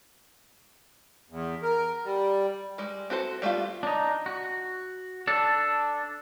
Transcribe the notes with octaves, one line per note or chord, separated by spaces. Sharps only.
E2
A#4
G3
G3 G#3
C4 F#4 A4 C5
G3 A3 B3 F4
D4 D#4
F#4
D4 A4